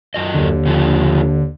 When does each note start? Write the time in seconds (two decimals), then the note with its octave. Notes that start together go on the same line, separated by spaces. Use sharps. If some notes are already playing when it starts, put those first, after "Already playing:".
0.14 F#2 F#4 D#5
0.34 D#2 D3
0.66 C#3 F3 A4